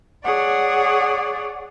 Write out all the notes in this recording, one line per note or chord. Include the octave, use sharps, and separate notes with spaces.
G#4 C#5 D5 F#5